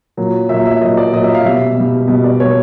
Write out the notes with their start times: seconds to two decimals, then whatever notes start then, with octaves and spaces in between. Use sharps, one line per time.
0.17 A#2 F#3
0.49 A#2 F#3 E5
0.65 E5
0.81 F#3 D#5
0.85 A#2
0.97 D5
1.13 A#2 D#5
1.17 F#3
1.24 E5
1.35 F5
1.45 B2 G3 E5
1.77 B2 G3
2.08 B2 G3 D#5
2.24 D5
2.40 B2 G3 C#5